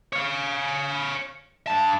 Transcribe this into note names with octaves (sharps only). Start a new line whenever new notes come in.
C#5 F5
G2 A5